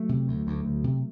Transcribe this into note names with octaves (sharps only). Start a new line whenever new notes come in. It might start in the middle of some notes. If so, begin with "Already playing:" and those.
Already playing: F#3 A3
C3
D2
D2
D2
C3